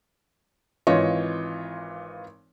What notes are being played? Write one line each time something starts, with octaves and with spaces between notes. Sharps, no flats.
G#1 E3 F4 C#5 D#5